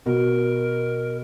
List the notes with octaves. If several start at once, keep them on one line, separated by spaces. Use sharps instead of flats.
B2 F#4 A#4